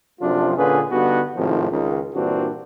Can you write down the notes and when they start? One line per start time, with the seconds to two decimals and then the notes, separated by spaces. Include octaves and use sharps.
0.20 F#2 C3 F3 A3 D4 F4
0.56 A#2 D3 C#4 F4 G#4 B4
0.91 G2 D3 B3 D#4 F#4
1.36 G#1 A2 C3 D#3 F3
1.70 C#2 D#3
2.14 G2 A#2 E3 C4 D4 F#4